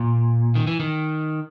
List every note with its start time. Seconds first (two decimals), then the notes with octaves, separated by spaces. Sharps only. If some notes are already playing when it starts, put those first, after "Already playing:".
Already playing: A#2
0.55 D#3
0.67 E3
0.80 D#3